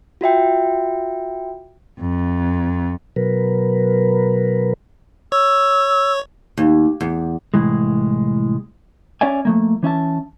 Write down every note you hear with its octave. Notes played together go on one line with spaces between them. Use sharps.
F4 F#4 E5 G5
F2
B2 F#3 A#4 B4
C#5 E6
D#2
E2
C2 A2 E3 G#3
C#4 C#5 D5 E5 G#5
F3 A3 A#3
E3 C#4 E5 A5